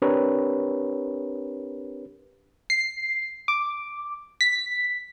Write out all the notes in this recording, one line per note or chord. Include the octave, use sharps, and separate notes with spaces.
C4 D4 G4 A#4 B4 C#5
C7
D6
B6